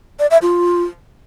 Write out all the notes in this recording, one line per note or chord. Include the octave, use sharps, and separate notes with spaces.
D5
E5
F4